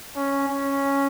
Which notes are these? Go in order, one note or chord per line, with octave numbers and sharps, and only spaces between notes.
C#4
C#4